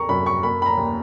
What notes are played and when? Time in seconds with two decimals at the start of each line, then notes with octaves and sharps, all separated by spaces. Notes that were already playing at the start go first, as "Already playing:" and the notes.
Already playing: D#2 A#3 A#5 C#6
0.09 F#2 B5
0.26 C#6
0.43 A#3 B5
0.62 B5
0.66 A#5
0.77 D#2